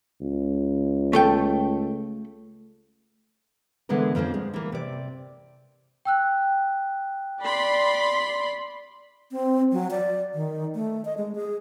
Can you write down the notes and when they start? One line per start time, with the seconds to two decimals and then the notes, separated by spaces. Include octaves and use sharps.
0.21 C#2
1.13 A3 A4 G5
3.89 D3 E3 G#3 B3 D4 A#4
4.15 F2 F3 A#3 C#4 D4
4.34 G#3
4.54 E3 A#3
4.72 C3 D5
6.05 G5 E6 F#6
7.41 D5 B5 C6
9.32 C4
9.72 F#3
9.91 D5
10.34 D#3
10.75 A3
11.05 D#5
11.17 G#3
11.35 G#4